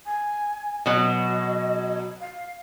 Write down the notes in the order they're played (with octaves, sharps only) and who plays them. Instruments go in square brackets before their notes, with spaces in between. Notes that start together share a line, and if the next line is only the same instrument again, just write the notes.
[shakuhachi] G#5
[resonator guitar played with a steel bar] B2 F#3 [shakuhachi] D#5
[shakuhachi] F5